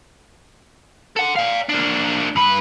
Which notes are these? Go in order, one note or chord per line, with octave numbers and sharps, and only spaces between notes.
A4 F#5
D5 F5
A#3 D4
G2 B4